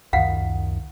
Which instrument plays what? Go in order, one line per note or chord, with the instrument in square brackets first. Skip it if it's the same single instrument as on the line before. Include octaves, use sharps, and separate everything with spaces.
[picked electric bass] C#2 F#2 D#3 [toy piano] F5 F#5